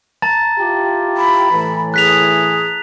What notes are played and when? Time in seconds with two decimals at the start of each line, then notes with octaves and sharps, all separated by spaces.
0.22 A5 A#5 A6
0.59 E4 F4 G4
1.17 B5
1.50 A2 E3
1.94 G#4 F#6 B6 F7